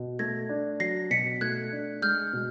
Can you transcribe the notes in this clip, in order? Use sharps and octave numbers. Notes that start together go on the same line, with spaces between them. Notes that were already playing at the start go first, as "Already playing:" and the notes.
Already playing: B2
A3 G#6 A#6
D4
F#3 A#6 C7
B2 B6 C#7
A3 F#6 G#6
D4
G#3 F6 G6
B2